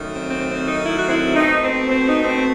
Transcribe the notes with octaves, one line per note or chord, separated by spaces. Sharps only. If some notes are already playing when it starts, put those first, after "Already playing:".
Already playing: F#2 D#3 F#3 A3
C4
C4
C4
D#4
E4
F#4
C4 E4
B2 A3 C4 D#4
C4
C4
D#4
C4